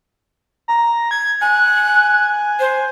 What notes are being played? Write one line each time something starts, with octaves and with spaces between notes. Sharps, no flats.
A#5
G#6
G#5 F#6
C5